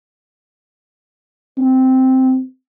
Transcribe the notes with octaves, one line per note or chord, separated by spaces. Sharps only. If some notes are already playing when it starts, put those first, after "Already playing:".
C4